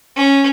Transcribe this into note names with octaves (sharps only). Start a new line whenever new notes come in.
C#4